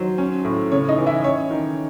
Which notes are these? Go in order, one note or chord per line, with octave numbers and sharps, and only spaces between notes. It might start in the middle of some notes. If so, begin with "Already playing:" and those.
Already playing: D#3 F#3 C5
C#4
A2
C#3 C#5
D#4 D#5
E3
E4 E5
C#4 C#5
D#3